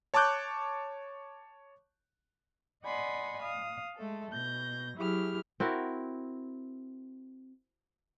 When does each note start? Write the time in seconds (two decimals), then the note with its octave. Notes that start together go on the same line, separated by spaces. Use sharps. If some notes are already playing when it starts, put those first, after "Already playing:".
0.14 C#5 A5 C#6 D6 F#6 G6
2.83 D5 D#5 F#5 G#5 B5 C6
3.41 F5 D#6
3.96 G#3 A3 A4
4.30 B2 G6 A#6
4.96 F#3 E4 G4 G#4 F6
5.60 C4 E4 F#4 A#4